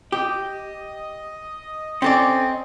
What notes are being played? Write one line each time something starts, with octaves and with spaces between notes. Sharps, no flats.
G4 D#5
C4 C#4 A4 D5